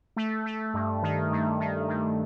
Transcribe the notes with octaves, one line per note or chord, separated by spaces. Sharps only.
A3
A3
G2
D#3
G2
D#3
G2